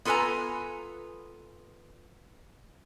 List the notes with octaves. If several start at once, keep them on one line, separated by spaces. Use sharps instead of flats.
B3 F4 A4 B4 G#5 A#5